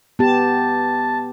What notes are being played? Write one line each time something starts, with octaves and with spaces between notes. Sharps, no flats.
B3 G4 A5